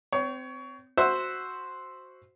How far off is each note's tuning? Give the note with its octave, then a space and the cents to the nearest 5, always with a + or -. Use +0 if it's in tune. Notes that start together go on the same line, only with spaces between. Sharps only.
C4 -25 C#5 +25
F#4 +0 C5 +0 E5 +0